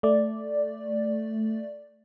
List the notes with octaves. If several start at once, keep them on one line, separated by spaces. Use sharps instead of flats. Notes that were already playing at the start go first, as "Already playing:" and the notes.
A3 D5